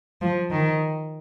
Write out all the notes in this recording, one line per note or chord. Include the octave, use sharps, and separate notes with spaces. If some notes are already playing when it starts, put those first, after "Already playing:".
F3
D#3